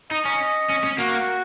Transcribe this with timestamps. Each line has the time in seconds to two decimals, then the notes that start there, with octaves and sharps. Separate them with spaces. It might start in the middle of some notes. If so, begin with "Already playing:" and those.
0.11 D#4 D#5
0.25 C#4
0.70 C#4
0.84 C#4
0.98 A#3 F#4